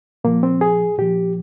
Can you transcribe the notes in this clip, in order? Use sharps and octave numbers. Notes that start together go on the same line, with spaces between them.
A#2 F3 A#3
C4
G#4
A#2 F3 G4